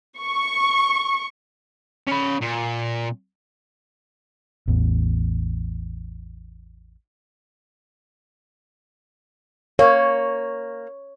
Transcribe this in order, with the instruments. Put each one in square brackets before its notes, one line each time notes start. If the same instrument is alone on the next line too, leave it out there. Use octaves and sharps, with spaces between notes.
[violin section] C#6
[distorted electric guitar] C#4 B5
A#2
[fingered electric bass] A1 E2
[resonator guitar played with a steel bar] A#3 [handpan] C#5